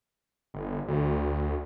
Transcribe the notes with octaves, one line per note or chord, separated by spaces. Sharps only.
G1
D2